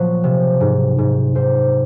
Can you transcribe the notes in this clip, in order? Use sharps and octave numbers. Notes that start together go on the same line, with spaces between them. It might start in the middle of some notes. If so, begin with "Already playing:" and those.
Already playing: A#2 F3 F#3 C#5
C3
G#2
G#2
G#2 C5